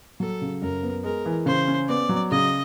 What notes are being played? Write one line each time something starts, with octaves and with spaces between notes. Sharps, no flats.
F#3 A4
C#3
F#2 A#4
B3
G#3 A#4
E3
C#3 C5
C#4
B3 D5
F#3
C#3 D#5